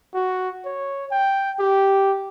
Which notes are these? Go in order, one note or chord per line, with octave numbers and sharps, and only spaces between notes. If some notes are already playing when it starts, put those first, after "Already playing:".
F#4
C#5
G5
G4